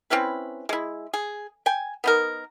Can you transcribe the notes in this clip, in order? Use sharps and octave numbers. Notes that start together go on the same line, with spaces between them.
C4 C#4 E4 B4
G#3 E4
G#4
G5 G#5
B3 D#4 A#4